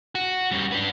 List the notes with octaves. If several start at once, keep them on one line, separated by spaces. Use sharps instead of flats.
F#4
G3 C#4
D4 B4